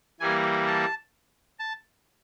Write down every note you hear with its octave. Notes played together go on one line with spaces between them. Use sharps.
E3 G3 A#3 G#5
A5
A5